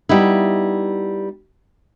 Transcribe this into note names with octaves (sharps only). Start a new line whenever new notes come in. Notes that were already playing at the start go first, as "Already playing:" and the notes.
G3 B3 D#4 E4